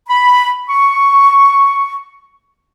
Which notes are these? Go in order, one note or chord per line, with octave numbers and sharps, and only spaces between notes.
B5
C#6